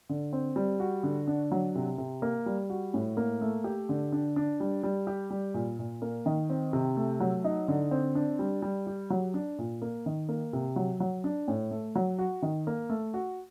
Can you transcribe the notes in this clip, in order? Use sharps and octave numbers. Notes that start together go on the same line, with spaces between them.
D3
C4
G3
F#4
D3
D4
F#3
C3
C3
A#3
G3
F#4
A2
A#3
A3
G4
D3
D4
D4
G3
G3
G4
G3
A#2
A#2
A#3
D#3
C4
C3
A3
F#3
D#4
D3
C4
D4
G3
G3
G4
F#3
D4
A#2
A#3
D#3
A#3
C3
F#3
F#3
D4
A2
A3
F#3
F#4
D#3
A#3
A3
F#4